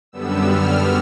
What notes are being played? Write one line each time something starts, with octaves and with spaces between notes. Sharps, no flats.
F#2 D3 G3 B3 E6
F6